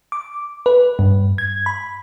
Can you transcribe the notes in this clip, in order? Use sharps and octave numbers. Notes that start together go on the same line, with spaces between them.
D6
B4
G2
G#6
B5